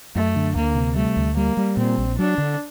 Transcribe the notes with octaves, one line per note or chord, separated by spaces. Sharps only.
F#2 A3
D3
D2 A#3
C3
G3 A3
D2
G3 A#3
G3
A#2 C4
A#1
F#3 D4
D3